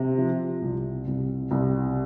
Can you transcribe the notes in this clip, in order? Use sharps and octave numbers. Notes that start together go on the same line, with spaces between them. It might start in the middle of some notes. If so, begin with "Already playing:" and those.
Already playing: C3
F3
C2
C2
C2